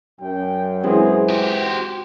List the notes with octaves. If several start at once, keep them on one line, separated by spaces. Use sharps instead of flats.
F#2 G5
E3 G#3 C4 G#4
F#4 G4 C5